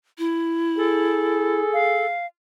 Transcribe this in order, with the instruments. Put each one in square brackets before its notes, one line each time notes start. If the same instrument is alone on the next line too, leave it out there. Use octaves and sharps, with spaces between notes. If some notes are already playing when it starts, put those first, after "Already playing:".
[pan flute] E4
[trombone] G#4 [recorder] A4
[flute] F5